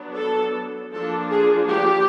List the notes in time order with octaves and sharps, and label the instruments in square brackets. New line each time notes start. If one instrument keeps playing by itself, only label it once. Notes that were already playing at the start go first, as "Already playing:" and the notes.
Already playing: [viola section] F#3 B3 D4
A4
F3 A#3 D4 A4
G#4
G4